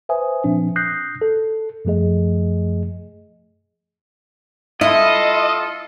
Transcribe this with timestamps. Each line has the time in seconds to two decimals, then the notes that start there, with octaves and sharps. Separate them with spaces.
0.09 B4 C5 E5 G#5 D#6
0.44 A#2 F3 C4 D4
0.76 D#6 F#6 G6 A#6 C7
1.22 A4
1.85 F#2 F3 A3 G#4 D#5
4.81 E4 F4 A4 D#5